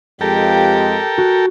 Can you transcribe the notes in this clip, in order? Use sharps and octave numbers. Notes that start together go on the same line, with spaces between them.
F2 G#3 G4 A4 A#4 G5
F#4